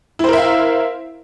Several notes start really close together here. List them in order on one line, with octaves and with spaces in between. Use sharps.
E4 C5 A#4 E5 F5